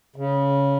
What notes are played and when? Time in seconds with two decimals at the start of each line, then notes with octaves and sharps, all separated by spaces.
0.16 C#3